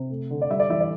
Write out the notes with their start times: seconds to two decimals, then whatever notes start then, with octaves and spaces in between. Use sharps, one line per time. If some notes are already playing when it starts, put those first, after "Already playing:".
Already playing: C3
0.10 A3
0.30 D3
0.41 D5
0.50 G3 E5
0.60 D5
0.70 E3 E5
0.81 D5